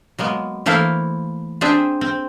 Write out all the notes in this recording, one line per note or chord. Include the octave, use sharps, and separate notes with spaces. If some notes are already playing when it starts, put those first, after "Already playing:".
F#3 G#3 A#3 B3
E3 A3 A#3 E4 C5 F5
C4 D4 G#4 E5
C4